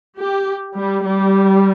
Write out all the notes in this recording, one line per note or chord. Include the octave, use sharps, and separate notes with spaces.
G4
G3
G3